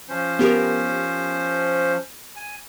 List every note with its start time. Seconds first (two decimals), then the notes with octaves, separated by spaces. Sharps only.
0.09 F3 C#4 C5
0.39 B3 G4 A#4
2.36 G#5